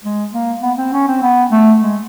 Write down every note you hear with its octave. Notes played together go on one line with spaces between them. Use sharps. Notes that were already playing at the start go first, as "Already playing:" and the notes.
G#3
A#3
B3
C4
C#4
C4
B3
A3
G#3